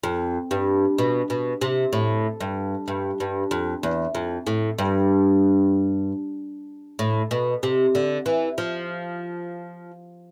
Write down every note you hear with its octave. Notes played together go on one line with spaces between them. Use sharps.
F2
G2
B2
B2
C3
A2
G2
G2
G2
F2
E2
F2
A2
G2
A2
B2
C3
D3
E3
F3